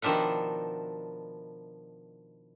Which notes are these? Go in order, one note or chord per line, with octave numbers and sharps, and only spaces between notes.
B2 D#3 F3 D4 E5 F#5